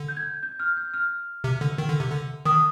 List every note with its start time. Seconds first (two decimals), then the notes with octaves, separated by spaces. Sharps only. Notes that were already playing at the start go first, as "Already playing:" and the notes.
Already playing: D3
0.09 G6
0.17 G#6
0.43 G6
0.60 F6
0.77 G6
0.94 F6
1.44 C3
1.61 D3
1.78 D#3
1.88 D3
2.00 C3
2.10 D3
2.45 D#3 D#6